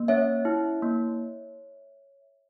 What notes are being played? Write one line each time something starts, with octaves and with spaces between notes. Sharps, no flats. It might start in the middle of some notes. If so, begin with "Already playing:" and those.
Already playing: A#3
C#4 C#5 E5
E4
A#3